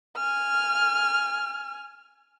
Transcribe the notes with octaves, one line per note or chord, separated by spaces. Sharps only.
G#5 F6